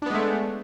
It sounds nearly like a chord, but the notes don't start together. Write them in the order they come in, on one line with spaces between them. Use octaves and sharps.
D4 B3 G#3 A3